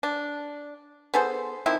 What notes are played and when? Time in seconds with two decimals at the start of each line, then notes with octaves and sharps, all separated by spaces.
0.03 D4
1.14 B3 G#4 A4 C5
1.66 D#3 F3 C4 E4